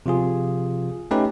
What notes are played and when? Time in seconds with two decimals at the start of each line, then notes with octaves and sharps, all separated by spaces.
0.06 C3 F3 F4 G#4
1.11 A3 C#4 D#4 G4 B4